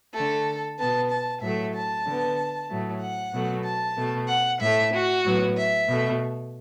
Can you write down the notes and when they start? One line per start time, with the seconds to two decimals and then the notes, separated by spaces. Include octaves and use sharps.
0.15 D3 A3 A4
0.79 B2 B3 A5
1.11 A5
1.42 A2 F#3 A3 E5
1.75 A5
2.06 D3 B3
2.70 A2 F#3 A3
3.02 F#5
3.34 B2 F#3 A3
3.65 A5
3.98 B2 A3
4.29 F#5
4.61 A2 A3 E5
4.93 F#4
5.25 A2 F#3 B3
5.57 E5
5.88 B2 A3